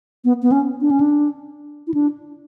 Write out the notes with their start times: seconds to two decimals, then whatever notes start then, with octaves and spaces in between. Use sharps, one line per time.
0.25 B3
0.42 B3
0.52 C#4
0.81 D4
0.91 C#4
1.00 D4
1.87 E4
1.94 D4